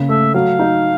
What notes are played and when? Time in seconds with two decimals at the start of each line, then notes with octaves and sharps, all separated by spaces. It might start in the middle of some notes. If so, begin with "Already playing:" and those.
Already playing: C#3 A#3
0.09 A3 E5
0.34 F#3 F5
0.59 D#4